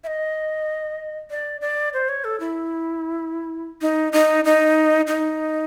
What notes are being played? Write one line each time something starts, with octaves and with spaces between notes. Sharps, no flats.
E5
D#5
D5
D5
C5
C#5
A4
E4
D#4
D#4
D#4
D#4